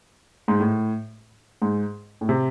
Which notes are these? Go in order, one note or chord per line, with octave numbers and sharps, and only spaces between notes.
G#2
A2
G#2
A2
C3